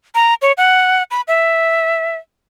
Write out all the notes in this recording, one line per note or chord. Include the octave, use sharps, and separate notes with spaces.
A#5
C#5
F#5
B5
E5